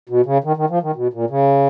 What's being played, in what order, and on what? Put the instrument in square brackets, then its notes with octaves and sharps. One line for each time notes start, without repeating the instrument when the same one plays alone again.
[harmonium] B2
C#3
D#3
D#3
F3
D#3
B2
A#2
C#3